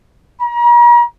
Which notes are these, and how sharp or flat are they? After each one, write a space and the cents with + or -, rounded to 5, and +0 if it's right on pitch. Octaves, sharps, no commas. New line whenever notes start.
A#5 +40